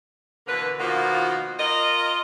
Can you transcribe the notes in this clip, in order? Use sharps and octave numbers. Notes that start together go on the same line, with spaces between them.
B2 D3 E3 A#3 B4
B2 D#3 F3 A#3 F4 F#4
F4 A#4 D#5